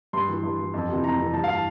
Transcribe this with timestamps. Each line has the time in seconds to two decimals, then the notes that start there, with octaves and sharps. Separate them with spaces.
0.13 G2 C6
0.28 E3
0.43 G2
0.59 E3
0.74 F2
0.89 C3 E3
1.04 F2 A#5
1.18 C3 E3
1.34 G2 A5
1.44 F5
1.49 E3 A5